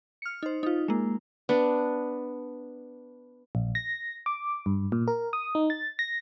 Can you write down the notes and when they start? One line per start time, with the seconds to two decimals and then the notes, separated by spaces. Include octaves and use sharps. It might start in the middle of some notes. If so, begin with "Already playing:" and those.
0.22 F6 C#7
0.43 D#4 C5
0.63 D#4 F4
0.88 G#3 A#3
1.49 B3 D4
3.55 A#1
3.75 A#6
4.26 D6
4.66 G2
4.92 A#2
5.08 A#4
5.33 D#6
5.55 D#4
5.70 A6
5.99 A#6